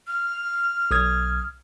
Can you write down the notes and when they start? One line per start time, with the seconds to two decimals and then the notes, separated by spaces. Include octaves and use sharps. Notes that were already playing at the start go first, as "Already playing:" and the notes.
0.07 F6
0.91 B1 D#6 G#6